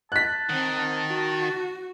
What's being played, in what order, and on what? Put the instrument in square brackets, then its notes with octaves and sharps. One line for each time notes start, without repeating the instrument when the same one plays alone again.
[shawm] A5 [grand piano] F#6 B6
[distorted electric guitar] D#3 [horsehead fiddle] C4 F#5
[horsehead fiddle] F#4